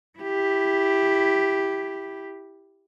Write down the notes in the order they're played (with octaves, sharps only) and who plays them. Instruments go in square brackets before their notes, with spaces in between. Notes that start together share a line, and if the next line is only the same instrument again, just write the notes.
[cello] E4 G4